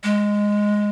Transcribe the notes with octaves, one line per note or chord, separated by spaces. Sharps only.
G#3